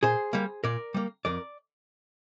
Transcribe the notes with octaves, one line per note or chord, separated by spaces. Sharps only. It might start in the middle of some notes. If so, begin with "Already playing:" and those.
A#2 G#4 C5
G3 A#3
A#2 A#4 D5
G3 A#3
F2 A#4 D5